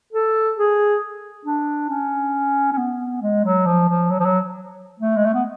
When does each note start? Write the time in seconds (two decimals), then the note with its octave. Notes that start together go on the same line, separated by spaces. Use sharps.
0.13 A4
0.57 G#4
1.45 D4
1.90 C#4
2.72 C#4
2.78 B3
3.22 G#3
3.45 F#3
3.66 F3
3.88 F3
4.10 F#3
4.20 F3
4.25 F#3
4.99 A3
5.17 G#3
5.25 A3
5.34 B3